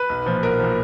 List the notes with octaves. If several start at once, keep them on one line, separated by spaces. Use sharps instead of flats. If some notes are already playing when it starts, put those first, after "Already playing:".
Already playing: B4
B1
A#2 F3
B1 A#4
A#2 F3